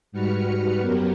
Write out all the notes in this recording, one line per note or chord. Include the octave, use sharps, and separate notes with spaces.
G#2 G3 F#4 B4 F6 C#7
F#2 F#3 B3 G4 A#4